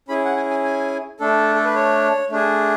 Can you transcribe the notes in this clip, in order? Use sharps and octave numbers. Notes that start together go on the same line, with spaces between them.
C#4 E4 G#4 B5
F#5
G#5
G#5
G#5
A3 D4 A4
A4
B4
C#5
A3 D4 G#4